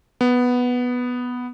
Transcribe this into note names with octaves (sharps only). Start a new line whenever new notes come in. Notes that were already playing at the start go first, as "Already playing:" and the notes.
B3